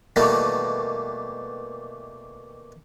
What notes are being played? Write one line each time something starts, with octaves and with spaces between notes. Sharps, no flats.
B2 D#3 E3 G3 A3 A#3